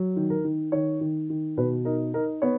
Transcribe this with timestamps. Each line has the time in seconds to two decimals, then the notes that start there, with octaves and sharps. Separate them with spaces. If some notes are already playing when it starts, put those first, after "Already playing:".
Already playing: F#3
0.16 D#3
0.30 A#4
0.44 D#3
0.72 D#3 C#5
1.01 D#3
1.30 D#3
1.57 B2 B4
1.85 D#4 A#4
2.14 D#4 A#4
2.42 B3 C#5